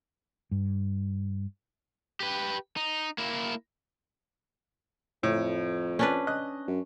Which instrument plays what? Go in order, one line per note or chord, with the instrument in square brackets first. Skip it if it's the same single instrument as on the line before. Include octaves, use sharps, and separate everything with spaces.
[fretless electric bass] G2
[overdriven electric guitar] G4 B4
D#4
A#3 E4
[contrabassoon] F2 [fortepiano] A2
[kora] C#4 D4 B4
[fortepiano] D#5 F#6
[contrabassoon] F#2